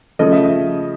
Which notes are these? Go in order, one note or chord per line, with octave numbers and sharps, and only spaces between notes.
C#3 F3 A3 D#5
E5
E5